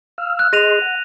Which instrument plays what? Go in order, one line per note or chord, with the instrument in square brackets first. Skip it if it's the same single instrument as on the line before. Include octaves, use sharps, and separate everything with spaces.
[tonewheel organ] F5 E6 F6
[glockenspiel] F#6
[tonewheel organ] G#4 D#5 C6 [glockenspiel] A#6 D#7 F7
[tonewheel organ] F#5